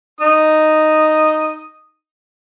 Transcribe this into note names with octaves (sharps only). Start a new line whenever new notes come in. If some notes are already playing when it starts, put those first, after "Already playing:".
D#4 D#6